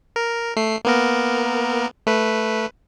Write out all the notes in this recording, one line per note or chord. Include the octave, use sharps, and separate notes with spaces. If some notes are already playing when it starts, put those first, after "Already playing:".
A#4
A3 C7
A#3 B3 A#4
A3 B4